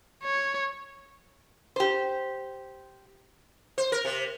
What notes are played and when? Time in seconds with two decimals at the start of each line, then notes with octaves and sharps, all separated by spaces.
0.24 C#5
1.76 G4 C5
3.78 C5
3.92 A#4
4.05 C3